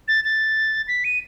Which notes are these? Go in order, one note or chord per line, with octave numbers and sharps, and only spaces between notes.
A6
A6
B6
D#7